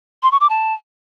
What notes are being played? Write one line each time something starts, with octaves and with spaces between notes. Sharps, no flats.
C6
C#6
D6
A5